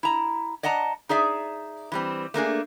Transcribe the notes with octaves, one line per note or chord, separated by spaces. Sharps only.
E4 A#5
D5 D#5 F#5 A5 A#5
D#4 G#4 D5 E5
E3 G3 C4
A3 A#3 D4 G#4